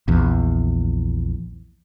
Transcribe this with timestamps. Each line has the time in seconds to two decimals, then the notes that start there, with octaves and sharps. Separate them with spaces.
0.08 A#1 E2